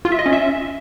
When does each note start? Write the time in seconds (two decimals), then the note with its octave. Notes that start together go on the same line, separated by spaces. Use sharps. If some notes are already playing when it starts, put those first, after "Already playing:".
0.05 F4
0.12 E5
0.19 D#5
0.26 C#4
0.33 E5